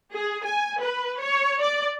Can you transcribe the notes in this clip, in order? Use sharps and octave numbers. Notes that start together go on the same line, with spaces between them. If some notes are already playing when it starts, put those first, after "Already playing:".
G#4
G#5
B4
C#5
D5